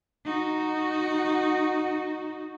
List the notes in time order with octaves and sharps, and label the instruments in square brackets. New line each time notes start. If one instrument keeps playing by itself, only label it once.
[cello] D#4 F#4